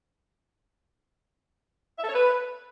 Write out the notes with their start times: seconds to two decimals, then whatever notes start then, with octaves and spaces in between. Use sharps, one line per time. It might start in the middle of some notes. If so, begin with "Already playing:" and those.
1.98 E5
2.03 A4
2.09 C#5
2.14 B4